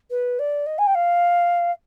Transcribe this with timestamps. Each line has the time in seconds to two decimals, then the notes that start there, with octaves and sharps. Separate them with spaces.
0.10 B4
0.39 D5
0.66 D#5
0.78 G#5
0.87 G5
0.94 F5